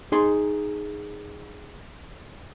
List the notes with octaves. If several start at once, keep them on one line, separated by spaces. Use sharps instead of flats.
D#4 G#4 C6